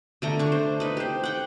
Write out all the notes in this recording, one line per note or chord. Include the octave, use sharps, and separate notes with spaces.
D3 A3 A#5
D4 C#6
C5
D#4 B4
G4 C5
F#5 G5